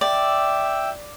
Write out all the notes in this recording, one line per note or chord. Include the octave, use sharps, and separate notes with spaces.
D5 E5 G5 E6